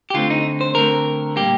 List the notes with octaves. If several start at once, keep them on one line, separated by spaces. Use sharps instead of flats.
G4
D3 A3 C4 F4
D#4
C5
D3 A3 C4 A#4
A#2 G3 A#3 G4